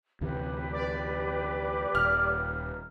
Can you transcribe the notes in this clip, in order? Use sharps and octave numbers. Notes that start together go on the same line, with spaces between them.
D2 C3 E3 G4 B4
D5
D#1 F6